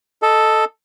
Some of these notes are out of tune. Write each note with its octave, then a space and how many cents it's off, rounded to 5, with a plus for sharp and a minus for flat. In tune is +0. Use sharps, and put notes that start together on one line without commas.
A4 +0 D#5 +0